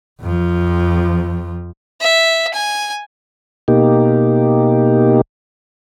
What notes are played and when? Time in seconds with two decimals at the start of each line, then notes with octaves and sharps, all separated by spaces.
0.21 F2 F3
2.01 E5
2.54 G#5
3.68 B2 A#3 D#4 G4